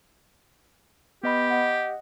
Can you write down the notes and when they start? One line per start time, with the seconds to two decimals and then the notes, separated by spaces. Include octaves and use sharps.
1.23 B3 G4 D#5 B5
1.50 D#5 F#5